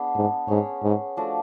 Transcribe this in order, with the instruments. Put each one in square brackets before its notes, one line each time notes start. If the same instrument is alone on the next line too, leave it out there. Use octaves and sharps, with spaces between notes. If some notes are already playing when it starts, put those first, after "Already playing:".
Already playing: [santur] B3 D4 G#4
[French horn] G#2
[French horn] G#2 [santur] C#4 G#4 C#5
[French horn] G#2
[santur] F3 A3 D4 F#4